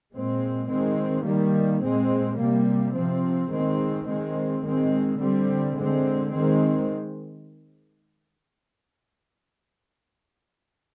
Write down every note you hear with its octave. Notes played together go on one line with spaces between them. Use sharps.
A#2 G#3 C4
D#3 G#3 C4
D#3 G3 A#3
A#2 G#3 C4
C3 G3 A#3
C3 F3 C4
D#3 G#3 C4
D#3 G#3 C4
D#3 G#3 C4
D3 G3 C4
D3 G#3 C4
D#3 G#3 C4